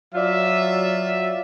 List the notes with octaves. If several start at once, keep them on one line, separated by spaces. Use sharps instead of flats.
F#3 F4 D5 E5